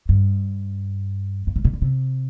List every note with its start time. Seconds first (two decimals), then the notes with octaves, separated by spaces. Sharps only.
0.09 G2
1.47 G2
1.56 G#2
1.65 A#2
1.73 D3
1.82 C3